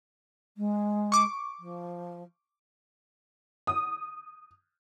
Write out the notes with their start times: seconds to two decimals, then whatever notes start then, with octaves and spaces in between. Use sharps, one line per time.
0.57 G#3
1.12 C#6 D6
1.59 F3
3.67 D#6